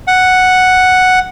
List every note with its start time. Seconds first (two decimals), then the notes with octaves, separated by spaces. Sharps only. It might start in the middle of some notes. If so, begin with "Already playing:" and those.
0.07 F#5